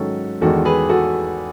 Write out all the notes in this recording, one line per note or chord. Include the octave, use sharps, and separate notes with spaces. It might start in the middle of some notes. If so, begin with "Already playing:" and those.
Already playing: G#2 D#3 F#3 C#4 F#4 A4
E2 D#3 G#3 F#4 A4
G#4 B4
F#4 A4